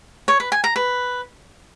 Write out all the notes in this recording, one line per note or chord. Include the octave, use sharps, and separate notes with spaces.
C#5
B4
G#5
A#5
B4